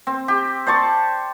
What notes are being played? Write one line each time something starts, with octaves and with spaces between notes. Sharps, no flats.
C4
G4
C5 D5 A5 C#6